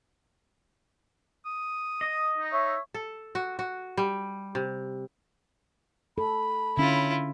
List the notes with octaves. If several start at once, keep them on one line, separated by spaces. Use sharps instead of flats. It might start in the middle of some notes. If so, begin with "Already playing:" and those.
D#6
D#5
D#4
C#5 E5
A4
F#4
F#4
G3
C3
A4 B5
D3 C#4 E4 F4